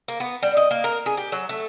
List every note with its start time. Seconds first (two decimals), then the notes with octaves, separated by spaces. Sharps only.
0.08 A#3
0.20 B3
0.43 G3
0.57 D#5
0.71 A#3
0.84 A#4
1.06 G#4
1.17 G4
1.32 F#3
1.49 A3